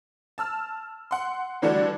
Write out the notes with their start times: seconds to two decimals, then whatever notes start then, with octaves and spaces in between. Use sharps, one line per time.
0.38 A5 E6 F6
1.11 F#5 C6
1.62 D3 E3 G3 A3 D4 F#4